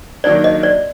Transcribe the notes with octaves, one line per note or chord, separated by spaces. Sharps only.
D#3 F#3 A#3 D4 D5
D#5
D5